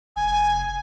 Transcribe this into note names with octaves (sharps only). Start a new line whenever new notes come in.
F1 G#5